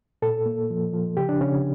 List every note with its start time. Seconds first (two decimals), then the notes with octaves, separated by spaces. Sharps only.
0.22 A#2 A4
0.46 A#3
0.70 F3
0.93 F3
1.17 C#3 G4
1.29 D4
1.40 C#3 C#4